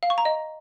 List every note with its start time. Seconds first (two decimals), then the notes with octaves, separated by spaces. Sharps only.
0.03 F5
0.10 C#6
0.18 A#5
0.25 D#5